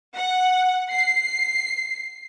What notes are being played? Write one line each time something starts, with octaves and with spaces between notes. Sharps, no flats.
F#5
C7